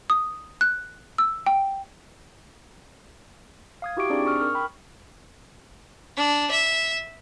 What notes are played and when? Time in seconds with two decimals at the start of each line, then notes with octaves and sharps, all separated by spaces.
0.10 D#6
0.61 F#6
1.18 E6
1.46 G5
3.82 F5 D#6 G#6
3.97 E4 F#4 G4 E5 C#6 D7
4.10 C4 D4 D#4 G#4 D5
4.26 C#6 D#6 F6
4.40 A#4 F6
4.54 G5 B5 C#6
6.17 D4
6.51 E5